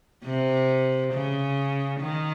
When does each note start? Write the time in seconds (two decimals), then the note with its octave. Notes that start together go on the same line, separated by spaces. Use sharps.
0.24 C3
1.13 C#3
2.00 D#3